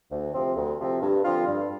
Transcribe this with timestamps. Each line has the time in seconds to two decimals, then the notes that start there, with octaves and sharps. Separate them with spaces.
0.11 D2
0.33 C3 F3 C4
0.56 D2
0.79 C3 F3 C4
1.02 G2
1.24 D3 F3 C4 F4
1.47 G2